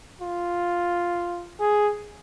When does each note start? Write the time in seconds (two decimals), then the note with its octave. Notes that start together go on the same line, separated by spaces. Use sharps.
0.22 F4
1.60 G#4